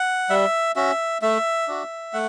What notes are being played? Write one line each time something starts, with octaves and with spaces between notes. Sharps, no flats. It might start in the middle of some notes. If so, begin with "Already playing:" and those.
Already playing: F#5
G3 E5
C#4 F#4 E5
A3 E5
D4 F#4
A3 F#5